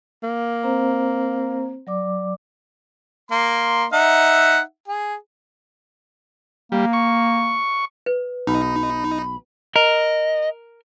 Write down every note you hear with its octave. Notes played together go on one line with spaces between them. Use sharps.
A#3
C4 C5 A#5
F#3 D5 D6
A#3 C6
D#4 E5 F#5
G#4
G3 A#3
C#6
B4
B1 D#4 B5
A#4 D#5